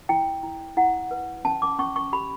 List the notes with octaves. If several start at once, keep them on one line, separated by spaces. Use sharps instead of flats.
E4 G5
E4
E4 F#5
B4
C#4 A5
D6
C#4 C#6
C#6
G4 B5